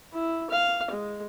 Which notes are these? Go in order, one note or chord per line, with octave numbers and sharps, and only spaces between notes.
E4
F5
G#3